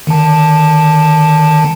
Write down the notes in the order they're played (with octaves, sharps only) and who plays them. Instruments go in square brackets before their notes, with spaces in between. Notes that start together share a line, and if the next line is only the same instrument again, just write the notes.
[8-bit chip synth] D3 D#3 A5